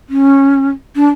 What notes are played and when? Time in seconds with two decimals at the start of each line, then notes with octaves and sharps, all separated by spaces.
0.09 C#4
0.95 D4